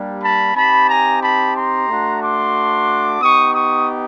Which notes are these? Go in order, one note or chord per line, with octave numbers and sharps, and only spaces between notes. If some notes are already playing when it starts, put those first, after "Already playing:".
Already playing: G3 A#3 D4 G4
A5 B5
C4 D#4 G4 A5 B5
G#5 A#5
A5 B5
A#5 C6
A3 D4 F#4
C6 D6
B3 D#4 G4 C#6 D#6
C#6 D#6